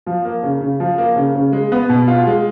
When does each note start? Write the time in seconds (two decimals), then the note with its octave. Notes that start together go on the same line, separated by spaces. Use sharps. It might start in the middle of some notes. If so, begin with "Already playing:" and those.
0.06 F3
0.25 A#3
0.43 C#3
0.61 C#3
0.80 F3
0.98 A#3
1.16 C#3
1.35 C#3
1.52 G#3
1.72 B3
1.89 B2
2.08 F4
2.27 G#3